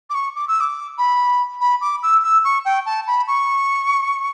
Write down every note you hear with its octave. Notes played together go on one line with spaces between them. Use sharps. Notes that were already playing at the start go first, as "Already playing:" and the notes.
D6
C#6
D6
E6
D6
B5
B5
D6
E6
E6
C#6
G5
A5
B5
C#6